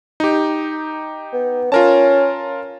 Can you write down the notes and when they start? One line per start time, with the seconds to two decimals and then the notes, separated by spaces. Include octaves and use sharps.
0.20 D#4 G4
1.33 B3
1.72 C#4 F4 A#4 A5